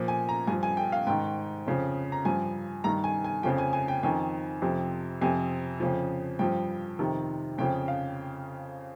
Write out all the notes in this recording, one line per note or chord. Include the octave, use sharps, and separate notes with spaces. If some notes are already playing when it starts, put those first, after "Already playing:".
Already playing: A#2 F3
G#5
A#5
G2 F3 G#5
G#5
G5
F5
G#2 D#3 G5
F2 C#3 F3
A#5
G2 F3 G#5
G2 D#3 A#5
G#5
G#5
F2 C#3 F3 G5
G#5
G#5
G5
F2 D#3 G#5
F2 C3 F3
F2 C3 F3 G#5
F2 C#3 F3
G2 F3 G5
F2 C3 D#3
F2 C#3 F3 G5
F5